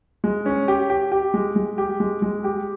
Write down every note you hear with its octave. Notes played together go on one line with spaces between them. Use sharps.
G#3
C#4
G4
G4
G4
G#3
G#3
G4
G#3
G#3
G4